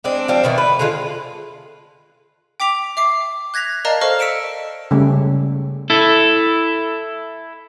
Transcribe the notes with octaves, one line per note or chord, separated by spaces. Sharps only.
G#3 C4 D4
F3 G3 C4 D4
B2 D#3 E3
B4
D3 G#3 F4
G5 D6 B6 F7
E5 D6 C7
F#6 G#6 A#6 B6 F7
A#4 D5 D#5 F5 A5 A#5
A4 C5 D#5 F5 C#6 F6
E6 B6 C#7 D7 E7
C#3 G3 A3
E4 A4